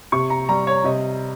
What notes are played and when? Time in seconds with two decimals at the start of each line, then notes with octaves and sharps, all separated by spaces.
0.12 C3 C#6
0.30 A#5
0.49 G3 A#5
0.67 C#5
0.84 C3 D#5